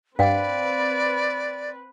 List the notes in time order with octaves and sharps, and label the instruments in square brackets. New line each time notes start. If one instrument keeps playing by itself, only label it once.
[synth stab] G2 [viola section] C4 B4 [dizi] D5 [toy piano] F5 G5